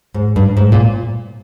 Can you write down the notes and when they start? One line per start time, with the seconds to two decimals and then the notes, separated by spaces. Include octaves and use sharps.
0.14 G#2
0.36 G2
0.57 G#2
0.72 A#2